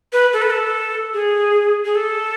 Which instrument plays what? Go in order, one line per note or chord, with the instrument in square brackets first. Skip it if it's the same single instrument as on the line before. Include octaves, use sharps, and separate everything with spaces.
[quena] B4
A4
B4
A4
G#4
G#4
A4